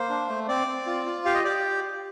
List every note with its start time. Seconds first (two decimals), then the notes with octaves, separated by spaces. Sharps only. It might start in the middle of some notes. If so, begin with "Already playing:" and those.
Already playing: A#3 C5
0.09 D4
0.29 A3
0.48 C4 D5
0.67 C4
0.87 F4
1.06 F4
1.25 G4 F5
1.34 D#5
1.44 G4 D5